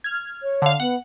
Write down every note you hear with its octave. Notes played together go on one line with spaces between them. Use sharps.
F6 G#6
C#5
D3 F5
B3 F#5